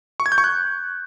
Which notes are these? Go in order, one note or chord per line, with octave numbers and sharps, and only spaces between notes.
C#6
G#6
G6
C#6
F#6